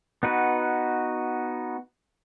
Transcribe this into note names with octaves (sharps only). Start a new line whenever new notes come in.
B3 D#4 F#4 B4